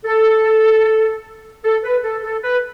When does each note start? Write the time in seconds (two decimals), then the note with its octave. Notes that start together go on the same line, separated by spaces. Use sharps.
0.05 A4
1.64 A4
1.84 B4
2.04 A4
2.24 A4
2.43 B4